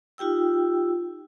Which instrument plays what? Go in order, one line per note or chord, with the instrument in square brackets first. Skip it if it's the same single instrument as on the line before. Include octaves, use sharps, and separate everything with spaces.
[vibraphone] D#4 F4 G4 G5 E6